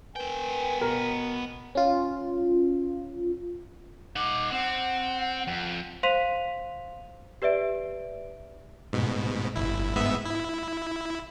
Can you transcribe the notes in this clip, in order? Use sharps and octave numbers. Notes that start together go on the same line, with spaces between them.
B3 A#4 B4 G5 G#5
B2 A#4
C#4 F4
D#4 F#5 D6
C4 F#5
F2
C5 F5 C6 B6 D#7 F7
G4 B4 D5 E5 D7
G#2 B2
G1 E4
G#2 B3 E5
E4